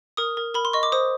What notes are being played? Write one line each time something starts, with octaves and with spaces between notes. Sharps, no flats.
A#4 D#6
A#4
A#4 B5
C6
D#5 C#6
D6
C5 D#6